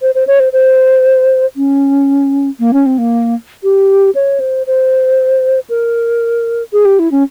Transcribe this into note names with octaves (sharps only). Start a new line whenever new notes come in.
C5
C5
C#5
C5
C5
C#4
A#3
C#4
C4
A#3
G4
C#5
C5
C5
A#4
G#4
G4
E4
C#4